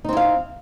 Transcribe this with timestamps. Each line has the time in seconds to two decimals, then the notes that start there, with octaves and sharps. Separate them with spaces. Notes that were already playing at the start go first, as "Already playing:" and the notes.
0.05 D#4
0.09 C4
0.13 E4
0.17 F5